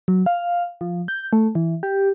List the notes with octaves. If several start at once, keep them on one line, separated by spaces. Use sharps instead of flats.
F#3
F5
F3
G6
A3
E3
G4